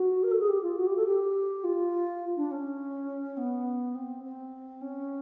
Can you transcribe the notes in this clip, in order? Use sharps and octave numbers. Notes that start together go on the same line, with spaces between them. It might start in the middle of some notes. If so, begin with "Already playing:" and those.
Already playing: F#4
A#4
A4
G#4
G4
F4
F#4
G4
A4
G4
F4
D4
C#4
B3
C4
C4
C#4